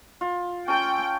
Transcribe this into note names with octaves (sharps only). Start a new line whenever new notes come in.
F4
C#4 A4 G5